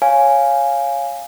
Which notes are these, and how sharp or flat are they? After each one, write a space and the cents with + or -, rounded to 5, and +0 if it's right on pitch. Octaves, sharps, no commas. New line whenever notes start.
C#5 +0 F5 +0 G#5 +0